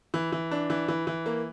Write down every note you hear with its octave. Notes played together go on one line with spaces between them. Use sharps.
E3
E3
D4
E3
E3
E3
A#3